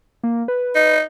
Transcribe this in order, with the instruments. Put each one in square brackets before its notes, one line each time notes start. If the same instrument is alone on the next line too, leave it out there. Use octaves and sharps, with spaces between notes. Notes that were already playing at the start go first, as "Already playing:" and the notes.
[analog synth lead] A#3
B4
[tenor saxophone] D#4